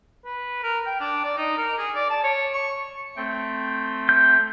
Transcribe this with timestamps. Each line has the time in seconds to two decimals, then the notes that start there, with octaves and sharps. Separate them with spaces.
0.25 B4
0.63 A#4
0.86 G5
1.00 D4
1.24 D5
1.37 D#4
1.57 A#4
1.78 G#4
1.95 D5
2.10 A5
2.24 C#5
2.53 C#6
3.16 A3 C4 G5
4.09 G6